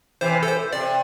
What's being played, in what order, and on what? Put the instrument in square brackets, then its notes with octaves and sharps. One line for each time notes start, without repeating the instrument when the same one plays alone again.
[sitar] C3 E3 [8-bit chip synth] C5
[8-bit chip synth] A4
C5
[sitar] C3 [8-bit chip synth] D5